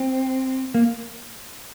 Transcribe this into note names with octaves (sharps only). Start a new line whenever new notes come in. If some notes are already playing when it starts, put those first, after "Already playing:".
Already playing: C4
A#3